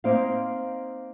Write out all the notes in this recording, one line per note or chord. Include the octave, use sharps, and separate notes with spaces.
A#3 C4 D#4 C5 F5